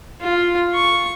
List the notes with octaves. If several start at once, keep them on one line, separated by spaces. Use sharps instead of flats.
F4
C#6